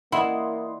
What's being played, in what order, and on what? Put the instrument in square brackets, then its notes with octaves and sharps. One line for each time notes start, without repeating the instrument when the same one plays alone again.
[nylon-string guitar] E3 D5 F#5 [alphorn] A#3 [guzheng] E4 [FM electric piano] D#5 C6